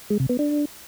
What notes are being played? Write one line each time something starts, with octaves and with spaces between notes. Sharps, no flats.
G#3
C3
B3
D4